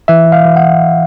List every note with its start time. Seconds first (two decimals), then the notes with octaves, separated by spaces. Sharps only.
0.08 E3 E5
0.26 E3
0.32 F5
0.44 E3
0.56 F#5